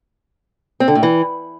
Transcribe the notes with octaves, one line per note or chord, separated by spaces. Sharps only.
C4
D3
A2
E3